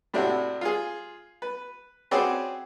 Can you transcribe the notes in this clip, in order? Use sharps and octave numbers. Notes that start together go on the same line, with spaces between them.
A2 C3 D4 E4 F#4
F4 G#4
B4
C4 C#4 F#4 G#4 B4 D5